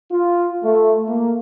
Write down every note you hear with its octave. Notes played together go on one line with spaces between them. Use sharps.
F4
A3
A#3